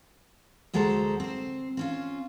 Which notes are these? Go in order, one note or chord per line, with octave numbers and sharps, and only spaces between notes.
D2 F#3 G#3 A4 C5 A#5
C4 C5
C4 C#4 F4